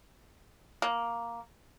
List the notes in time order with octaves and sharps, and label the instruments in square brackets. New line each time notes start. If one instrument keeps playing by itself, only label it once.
[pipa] A#3